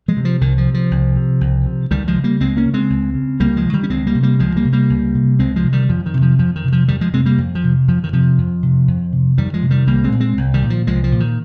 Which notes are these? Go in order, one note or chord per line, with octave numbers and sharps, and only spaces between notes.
F3 G#3
C3
F3
C2 D#3
F3
C3
F3
C2
C3
C2
C3
C#2 D#3 G3
F3 G#3
C#3
G3 A#3
C#2 G#3 C4
A#3 C#4
C#3
G#3 C4
C#2
C#3
C#2 G3 A#3
F3 G#3
C#3
D#3 G3
C#4
C#2 G#3 C4
G3 A#3
C3
G3 A#3
C#2 F3 G#3
G3 A#3
C3
G3 A#3
C#2
C3
C#2 G#3 C4
F3 G#3
C3
D#3 G3
F2 F3
D#3
C3
F3
F2 F3
D#3
C3
F3
F2 D#3 G3
F3 G#3
C3 G#3 C4
G3 A#3
F2
F3
C3
F2 F3
D#3
C3 F3
F2
C3
F2
C3
F2 D#3 G3
F3 G#3
C3
D#3 G3
C2 G3 A#3
G#3 C4
A#2
G#3 C4
C2
D#3 G3
A#2
F3
C2 F3 G#3
F3
A#2
D#3